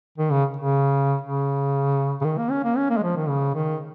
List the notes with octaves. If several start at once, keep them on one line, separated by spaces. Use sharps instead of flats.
D#3
C#3
C#3
C#3
C#3
D#3
A#3
C#4
A#3
C#4
A#3
G#3
F3
D#3
C#3
D#3